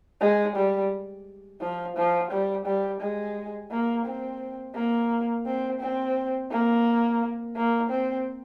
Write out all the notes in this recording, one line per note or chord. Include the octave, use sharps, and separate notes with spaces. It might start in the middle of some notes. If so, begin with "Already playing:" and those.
G#3
G3
F3
F3
G3
G3
G#3
A#3
C4
A#3
C4
C4
A#3
A#3
C4